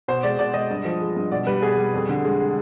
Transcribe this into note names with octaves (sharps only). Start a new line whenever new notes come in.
B2 C5
G#3 D5
B2 D5
G#3 D#5
G2
F3
G#3
G2
B2 D5
G3 B4
B2 G#4
G3
F2
D3
G#3